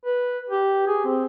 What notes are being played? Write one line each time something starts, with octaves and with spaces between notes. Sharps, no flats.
B4
G4
G#4
C4